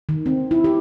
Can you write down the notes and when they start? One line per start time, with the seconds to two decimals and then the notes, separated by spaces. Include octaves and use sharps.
0.09 D#3
0.26 C4
0.51 E4
0.64 G4